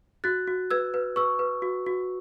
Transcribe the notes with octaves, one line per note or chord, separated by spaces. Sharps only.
F#4 F#6 A6
F#4
B4 E6 G#6
B4
B4 C#6 E6
B4
F#4
F#4